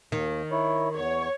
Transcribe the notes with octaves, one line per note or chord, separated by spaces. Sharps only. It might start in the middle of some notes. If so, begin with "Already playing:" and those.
D#2 D#3
E4 C#5
E2 C#5